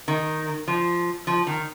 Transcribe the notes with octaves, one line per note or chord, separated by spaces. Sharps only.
D#3
F3
F3
D#3